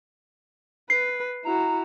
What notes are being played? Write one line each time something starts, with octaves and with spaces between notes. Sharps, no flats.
B4 C7
E4 F#4 A#5